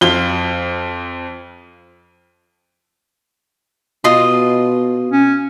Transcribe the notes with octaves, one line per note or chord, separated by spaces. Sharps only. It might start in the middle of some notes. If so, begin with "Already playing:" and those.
F2 F4 G7
B2 F4 D#5 C6
C#4